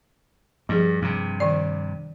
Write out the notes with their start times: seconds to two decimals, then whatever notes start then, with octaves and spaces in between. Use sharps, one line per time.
0.69 G2 F3 G#4
1.02 G2 C3
1.40 D#3 D5